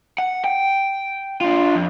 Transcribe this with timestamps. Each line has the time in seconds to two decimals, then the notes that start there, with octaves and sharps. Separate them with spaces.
0.18 F#5
0.44 G5
1.41 D4 F4
1.75 F2